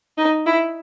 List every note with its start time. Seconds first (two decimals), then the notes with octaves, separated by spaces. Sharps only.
0.18 D#4
0.46 E4